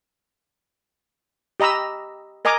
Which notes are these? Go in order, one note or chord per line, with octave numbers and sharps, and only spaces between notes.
G4 D#5 A#5 B5 E6
A#4 D#5 G#5 A#5 D6